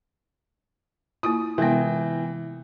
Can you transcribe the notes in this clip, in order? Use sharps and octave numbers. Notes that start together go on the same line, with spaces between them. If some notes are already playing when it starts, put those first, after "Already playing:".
A#3 E4 F4 D#6
C3 E3 G#3 B3 G5